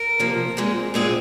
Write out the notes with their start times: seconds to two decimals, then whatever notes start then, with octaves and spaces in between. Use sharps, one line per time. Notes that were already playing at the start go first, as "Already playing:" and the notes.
Already playing: A#4
0.19 C3 F3 A#3
0.57 A#2 G#3 C4
0.94 A#2 G#3 C4 G#4